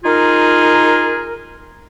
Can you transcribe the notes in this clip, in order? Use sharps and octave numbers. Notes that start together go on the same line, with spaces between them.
D#4 F4 G#4 A#4